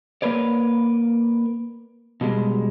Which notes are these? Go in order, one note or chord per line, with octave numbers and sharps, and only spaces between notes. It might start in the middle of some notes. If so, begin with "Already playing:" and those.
A#3 A#4 B4 C#5 D5
B2 G3 G#3